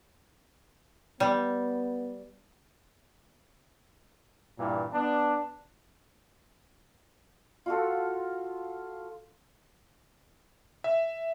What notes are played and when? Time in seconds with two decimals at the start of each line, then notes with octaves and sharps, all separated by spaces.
1.20 G3 B3
4.59 G2 A#2 E3
4.93 B3 D4
7.66 F4 F#4 A4
10.84 E5